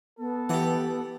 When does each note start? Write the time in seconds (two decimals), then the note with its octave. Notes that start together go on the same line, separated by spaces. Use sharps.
0.19 B3 A4
0.49 E3 G4 F#5